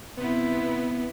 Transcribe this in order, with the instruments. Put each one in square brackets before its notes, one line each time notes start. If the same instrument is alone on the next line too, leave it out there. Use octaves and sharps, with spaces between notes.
[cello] C3 E4 [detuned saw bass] B3